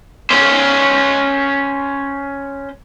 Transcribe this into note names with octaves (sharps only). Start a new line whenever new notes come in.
C#4 C5